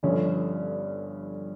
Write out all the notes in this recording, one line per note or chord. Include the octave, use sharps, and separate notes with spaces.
G1 G2 D3 F3 C#4